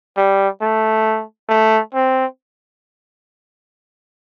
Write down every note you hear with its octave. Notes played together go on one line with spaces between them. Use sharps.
G3
A3
A3
C4